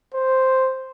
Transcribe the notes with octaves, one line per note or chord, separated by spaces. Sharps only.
C5